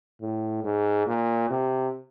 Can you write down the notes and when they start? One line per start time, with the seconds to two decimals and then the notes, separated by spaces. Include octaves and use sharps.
0.21 A2
0.64 G#2
1.07 A#2
1.50 C3